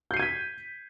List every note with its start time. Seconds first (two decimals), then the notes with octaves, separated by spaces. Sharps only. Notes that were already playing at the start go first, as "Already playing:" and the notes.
0.11 G6
0.14 C7
0.17 D#7
0.20 G#6
0.22 B6